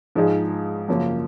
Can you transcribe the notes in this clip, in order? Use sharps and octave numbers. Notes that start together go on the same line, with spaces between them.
G#2 F3 G#3 D#4 G#4
F#2 C#3 F3 A#3